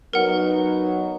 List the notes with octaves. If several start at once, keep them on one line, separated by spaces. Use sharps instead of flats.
F#3 B3 D#4 A#4 F#5